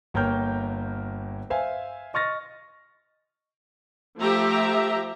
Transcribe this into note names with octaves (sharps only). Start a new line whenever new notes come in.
G1 A#3 C#5 G5 F6 G6
C5 E5 F5 G#5
D#5 C#6 F6 A6 A#6
F3 A3 G4 E5 A#5